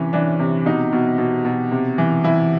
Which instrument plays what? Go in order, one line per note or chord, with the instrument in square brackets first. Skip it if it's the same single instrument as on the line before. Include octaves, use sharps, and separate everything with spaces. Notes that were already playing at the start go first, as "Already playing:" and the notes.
Already playing: [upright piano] C3 E3 C#4
E3 D4
C3
B2 D#4
B2
B2
B2
C3
E3
E3 E4